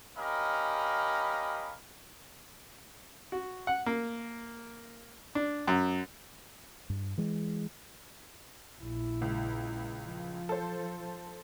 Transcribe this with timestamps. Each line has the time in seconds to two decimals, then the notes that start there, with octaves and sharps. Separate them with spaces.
0.17 C#4 G4 A#4 D#5 F5 B5
3.32 F#4
3.67 F#5
3.86 A#3
5.35 D4
5.68 F#2
6.90 G2
7.18 E3 G#3
8.81 A#1 E4
9.21 C#2
10.07 F3
10.49 A4 C5